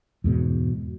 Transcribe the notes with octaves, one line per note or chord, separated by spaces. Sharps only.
E2 G#2 B2